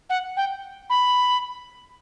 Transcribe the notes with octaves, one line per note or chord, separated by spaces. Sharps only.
F#5
G5
B5